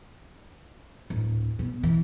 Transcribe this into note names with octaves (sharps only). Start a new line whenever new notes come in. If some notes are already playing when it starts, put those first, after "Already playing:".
D1
B2
E3